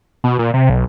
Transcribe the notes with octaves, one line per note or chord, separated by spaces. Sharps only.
B2
A#2
C3
B1